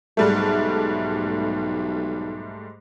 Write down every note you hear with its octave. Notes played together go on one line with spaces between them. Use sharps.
B1 G#2 G3 A3